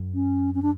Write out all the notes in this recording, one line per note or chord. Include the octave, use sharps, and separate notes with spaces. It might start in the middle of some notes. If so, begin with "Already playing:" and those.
Already playing: F#2
C#4
C#4
D4